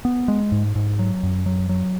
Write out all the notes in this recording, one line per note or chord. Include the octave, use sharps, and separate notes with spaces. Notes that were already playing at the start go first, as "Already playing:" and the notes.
B3
G#3
G#2
G#2
F#3
F#2
F#3
F#3